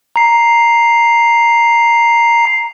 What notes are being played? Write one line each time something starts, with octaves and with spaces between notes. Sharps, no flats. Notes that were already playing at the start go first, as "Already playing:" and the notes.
A#5 C7